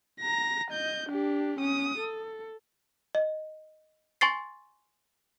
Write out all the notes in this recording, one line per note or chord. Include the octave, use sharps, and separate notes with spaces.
A#5 A#6
D#5 G6
D4 G4
C#4 D#6
A4
D#5
G#5 C6 C#6 A6 C7